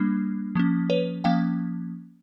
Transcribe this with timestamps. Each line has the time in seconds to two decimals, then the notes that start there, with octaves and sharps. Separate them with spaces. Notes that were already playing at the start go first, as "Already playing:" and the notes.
Already playing: G3 A#3 D4
0.55 F3 A#3 C#4
0.90 B4 C#5
1.24 F3 A#3 C#4 F5 G5